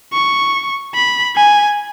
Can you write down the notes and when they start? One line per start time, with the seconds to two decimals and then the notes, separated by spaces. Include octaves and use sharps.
0.13 C#6
0.94 B5
1.36 G#5